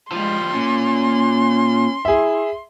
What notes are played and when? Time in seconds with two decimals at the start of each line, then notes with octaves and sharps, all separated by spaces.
0.12 F3 G3 G#3 C6
0.52 A#2 C#4
2.05 E4 G#4 E5